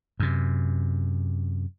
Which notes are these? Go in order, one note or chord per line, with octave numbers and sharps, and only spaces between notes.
F#2 C3